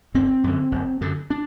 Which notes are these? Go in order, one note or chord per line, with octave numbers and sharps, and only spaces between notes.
F#1 C4
F#2 D3
F#1
F#2 D3
D4